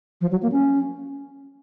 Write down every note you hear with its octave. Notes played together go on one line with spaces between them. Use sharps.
F3
F#3
A#3
C#4